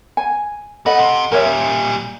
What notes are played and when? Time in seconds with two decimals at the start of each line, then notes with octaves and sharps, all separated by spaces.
0.17 G#5
0.86 A3 A4 B4 D#5 F#5
0.99 C3
1.32 A#2 G3 A#4 C#5 E5